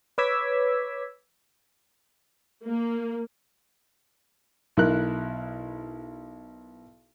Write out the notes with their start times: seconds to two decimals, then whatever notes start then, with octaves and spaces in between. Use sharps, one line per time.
0.18 B4 C#5 D6 E6 G#6 B6
2.65 A#3
4.77 B1 E4 A#4 F#6